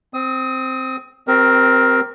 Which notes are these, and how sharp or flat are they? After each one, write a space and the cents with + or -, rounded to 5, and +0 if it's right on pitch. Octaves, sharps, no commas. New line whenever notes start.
C4 +0 D#6 +25
C4 +0 G4 -25 A#4 +10